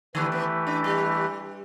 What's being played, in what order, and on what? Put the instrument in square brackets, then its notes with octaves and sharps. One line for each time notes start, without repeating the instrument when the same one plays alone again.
[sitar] D3 [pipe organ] E3 A3 E4 G4 B4
[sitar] B3
D4
G3